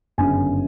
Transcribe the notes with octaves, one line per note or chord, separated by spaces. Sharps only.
G1 F#2 C#3 G#5